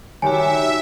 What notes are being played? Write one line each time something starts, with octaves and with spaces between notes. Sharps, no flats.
D#3 G3 F#4 G4 C#5 E5 G#5